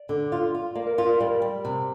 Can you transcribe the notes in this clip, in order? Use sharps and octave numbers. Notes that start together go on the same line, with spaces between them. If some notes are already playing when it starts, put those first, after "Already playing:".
Already playing: D5
D3
F4
F4
A#3 D5 F5
A#4
F4 A#4
A#4 D5
G3 A#4 D5
G3
C3